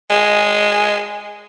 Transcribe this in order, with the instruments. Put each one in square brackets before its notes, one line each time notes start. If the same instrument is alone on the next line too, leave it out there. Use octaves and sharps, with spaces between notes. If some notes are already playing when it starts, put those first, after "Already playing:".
[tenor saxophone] G#3